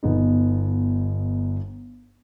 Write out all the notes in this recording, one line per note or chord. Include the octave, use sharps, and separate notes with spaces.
G1 B3 D#4